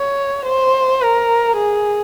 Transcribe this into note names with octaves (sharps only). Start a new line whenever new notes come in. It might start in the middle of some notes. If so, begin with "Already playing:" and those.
Already playing: C#5
C5
A#4
G#4